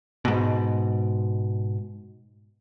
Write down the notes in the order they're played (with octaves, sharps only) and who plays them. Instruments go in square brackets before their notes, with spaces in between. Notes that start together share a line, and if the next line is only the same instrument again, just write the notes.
[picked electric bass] G#2 B2